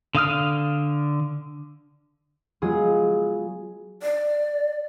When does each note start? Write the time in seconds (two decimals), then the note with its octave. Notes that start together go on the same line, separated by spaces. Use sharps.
0.15 D3 F5 D#6 F6
2.62 F#3 G#3 B3 F4 G#4
4.03 D5